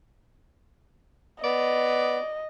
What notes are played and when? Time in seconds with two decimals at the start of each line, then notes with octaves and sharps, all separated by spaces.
1.44 B3 D5 D#5